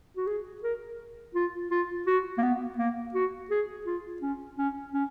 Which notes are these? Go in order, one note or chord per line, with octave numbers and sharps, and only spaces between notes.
F#4
G#4
A#4
F4
F4
F#4
A#3
B3
A#3
F#4
G#4
F4
C#4
C#4
C#4